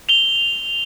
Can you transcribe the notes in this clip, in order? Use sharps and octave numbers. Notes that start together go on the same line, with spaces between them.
F7 G7